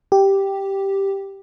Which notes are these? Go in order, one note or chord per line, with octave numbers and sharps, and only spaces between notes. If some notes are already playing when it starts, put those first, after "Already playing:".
G4